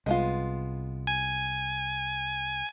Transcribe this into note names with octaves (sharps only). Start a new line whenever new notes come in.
C2 G#3 B3 F4
G#5